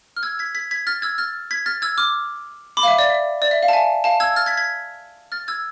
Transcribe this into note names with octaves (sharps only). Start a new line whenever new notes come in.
F6
E6 G#6
G#6 B6
G#6 B6
G#6 B6
F6 A6
E6 G#6
F6 A6
G#6 B6
F6 A6
E6 G#6
D6 F6
B5 D6
F5
E5
D5
E5
D5
E5
F5
A5
E5 G#5
F5 A5
E6 G#6
F6 A6
G#6 B6
G#6 B6
F6 A6
E6 G#6